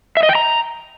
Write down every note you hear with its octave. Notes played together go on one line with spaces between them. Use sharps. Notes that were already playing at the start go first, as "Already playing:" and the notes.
E5
D#5
G5
A#5